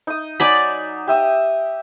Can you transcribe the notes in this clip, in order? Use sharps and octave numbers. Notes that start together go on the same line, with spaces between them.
D#4 D#6
F#3 D#4 D5 G#5 B5
G4 E5 D#6